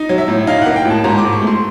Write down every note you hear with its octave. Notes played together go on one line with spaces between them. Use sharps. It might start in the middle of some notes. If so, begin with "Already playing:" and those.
Already playing: D#4
F#3
E5
A2
D#4 F5
F#5
A#3
G5
A2 A5
G#2 A#5
D6
G#2
C#6
A3
C6